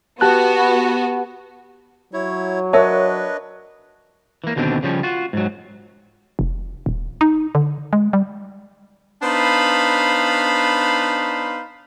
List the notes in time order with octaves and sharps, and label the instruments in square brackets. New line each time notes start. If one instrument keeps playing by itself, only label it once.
[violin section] B3 F#4 [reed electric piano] G4 A5 F#6
[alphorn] F#3 [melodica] E4 C#5
[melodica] D4 B4 D#5 [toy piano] A#4 E5 A5 [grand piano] C#5
[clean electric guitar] E3 A#3
D#2 B2 D3 B3 C4 D4
C#3 F3 G3 C#4
F4 F#4
G#2 F#3
[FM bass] F1
D#1
D#4
D3
G#3
G3
[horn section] B3 D4 D#4 C5 F5 B5